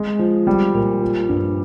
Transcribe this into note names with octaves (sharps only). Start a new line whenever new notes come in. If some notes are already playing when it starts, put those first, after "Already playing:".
Already playing: G#3
F3
G3
A#2
F3
G2